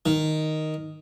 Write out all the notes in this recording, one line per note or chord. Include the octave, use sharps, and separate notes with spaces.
D#3